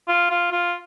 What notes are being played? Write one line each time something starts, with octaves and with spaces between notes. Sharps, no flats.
F4
F4
F4